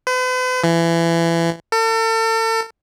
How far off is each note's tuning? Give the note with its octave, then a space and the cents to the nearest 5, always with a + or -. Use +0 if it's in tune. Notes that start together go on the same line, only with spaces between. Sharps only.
B4 +45
E3 +25
A4 +40